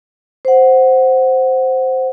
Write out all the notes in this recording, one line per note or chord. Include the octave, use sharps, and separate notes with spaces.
C5 F#5